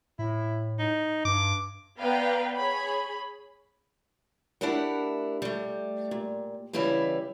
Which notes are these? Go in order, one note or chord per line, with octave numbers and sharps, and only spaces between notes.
A2 E4
D#4
G2 D6
B3 B4 D5 F5 G5 A#5
G#4 C#5 B5
A3 D4 E4 G4 A#4 F#5
G3 A3
A#2
C#3 E3 G3 E4 B4 F5